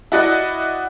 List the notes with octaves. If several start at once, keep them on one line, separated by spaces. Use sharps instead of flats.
E4 F#4 D5 D#5 F#5